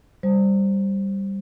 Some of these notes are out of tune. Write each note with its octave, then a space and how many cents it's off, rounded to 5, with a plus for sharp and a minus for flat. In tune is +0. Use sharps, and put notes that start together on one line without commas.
G3 +0 C5 +0